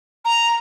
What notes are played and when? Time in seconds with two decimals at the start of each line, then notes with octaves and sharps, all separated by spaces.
0.25 A#5